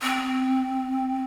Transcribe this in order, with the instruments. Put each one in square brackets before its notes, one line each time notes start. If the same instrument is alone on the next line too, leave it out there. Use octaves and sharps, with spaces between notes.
[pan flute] C4